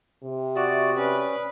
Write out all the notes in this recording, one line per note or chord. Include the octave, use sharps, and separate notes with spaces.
C3
F#4 D5 E5 C#6 D#6
C#4 B4 D5 D#6